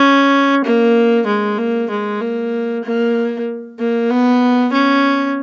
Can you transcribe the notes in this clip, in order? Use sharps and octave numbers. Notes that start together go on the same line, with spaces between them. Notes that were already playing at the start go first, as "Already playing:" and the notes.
Already playing: C#4
A#3
G#3
A#3
G#3
A#3
A#3
A#3
B3
C#4